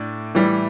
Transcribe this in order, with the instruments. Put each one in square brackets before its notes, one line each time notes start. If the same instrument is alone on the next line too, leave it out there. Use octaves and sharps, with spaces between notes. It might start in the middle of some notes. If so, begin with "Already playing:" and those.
Already playing: [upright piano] A2 D4
A2 E3 G3